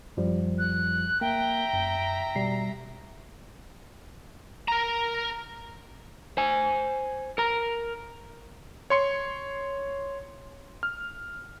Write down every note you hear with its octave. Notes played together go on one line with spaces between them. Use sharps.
F#2 F3 G3
F#6
A#3 E5 G5 A#5
F#2
B2 G3 C7
A#4 A#5
C5 G#5
A#4 A#5
C#5 C6 C#7
F6